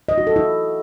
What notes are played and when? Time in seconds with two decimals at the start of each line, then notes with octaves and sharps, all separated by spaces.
0.09 D#5
0.18 F#4
0.27 A4
0.36 E4